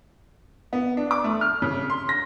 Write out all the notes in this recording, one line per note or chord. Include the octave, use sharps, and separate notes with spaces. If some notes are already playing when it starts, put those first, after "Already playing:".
B3
D4
D6
A3
F6
C#3
C6
A#6